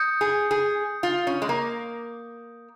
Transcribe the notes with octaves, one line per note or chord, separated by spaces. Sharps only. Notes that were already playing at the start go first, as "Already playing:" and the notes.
Already playing: D#6 G6 C#7
G#4
G#4
F4
C#4
G#3
A#3